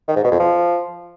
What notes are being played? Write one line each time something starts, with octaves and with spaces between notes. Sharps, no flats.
D#3
G#2
B2
F2
F3